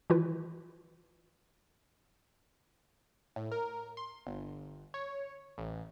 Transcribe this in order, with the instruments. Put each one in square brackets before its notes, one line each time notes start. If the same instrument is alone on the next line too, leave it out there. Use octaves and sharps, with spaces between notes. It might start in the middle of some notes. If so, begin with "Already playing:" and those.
[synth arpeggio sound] D#3 E3 E4 F4 B4
[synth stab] A2
A#4
C6
G1
C#5
A1